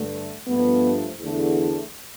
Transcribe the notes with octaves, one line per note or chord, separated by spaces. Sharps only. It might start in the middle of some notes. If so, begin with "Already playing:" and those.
Already playing: G2 D3 A3
G2 F3 A3 B3
E2 D3 A3